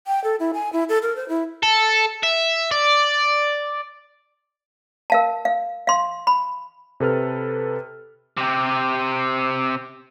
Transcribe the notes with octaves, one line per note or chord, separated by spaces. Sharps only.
G5
A4
E4
G#5
E4
A4
A#4
C5
E4
A4
E5
D5
A#4 F5 A5
F5
F5 C6
B5
C3 A4 B4 F6
C3 G4